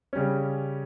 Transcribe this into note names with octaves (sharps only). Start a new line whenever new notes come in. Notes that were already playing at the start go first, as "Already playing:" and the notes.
C#3 G3 C#4